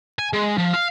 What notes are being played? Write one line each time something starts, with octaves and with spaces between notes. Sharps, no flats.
G#5
G#3
F3
F5